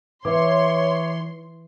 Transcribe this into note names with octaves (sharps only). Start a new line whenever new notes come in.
E3 C#5 E5 C6 D6